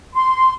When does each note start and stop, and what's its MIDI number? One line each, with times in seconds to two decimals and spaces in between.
0.15 0.53 84